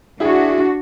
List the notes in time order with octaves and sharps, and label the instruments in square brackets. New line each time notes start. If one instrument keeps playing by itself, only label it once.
[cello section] D4 F#4 [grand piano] E4 G#4 E5